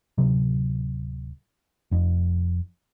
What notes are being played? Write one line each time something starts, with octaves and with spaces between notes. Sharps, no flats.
D1 C3 F#3
F1 F2